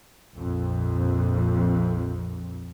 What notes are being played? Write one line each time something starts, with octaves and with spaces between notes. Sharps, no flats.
A#1 F2